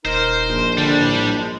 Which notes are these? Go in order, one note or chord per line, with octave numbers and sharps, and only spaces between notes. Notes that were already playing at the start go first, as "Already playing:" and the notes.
D#1 D#4 A#4 C5
A#1
D3 G3 D4
A2
G#3